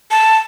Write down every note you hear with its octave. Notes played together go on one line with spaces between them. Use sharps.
A5